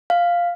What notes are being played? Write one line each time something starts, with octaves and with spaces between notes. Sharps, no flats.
F5